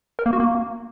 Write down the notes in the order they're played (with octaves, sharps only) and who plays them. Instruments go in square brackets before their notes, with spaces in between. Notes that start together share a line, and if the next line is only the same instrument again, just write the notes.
[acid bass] A#4
A#3
F#4
A#3